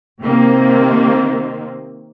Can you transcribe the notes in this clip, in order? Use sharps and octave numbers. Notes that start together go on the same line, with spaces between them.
C3 D#3 A#3 C4